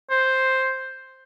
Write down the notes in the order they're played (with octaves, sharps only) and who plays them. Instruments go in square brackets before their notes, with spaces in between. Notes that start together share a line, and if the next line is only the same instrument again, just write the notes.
[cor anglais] C5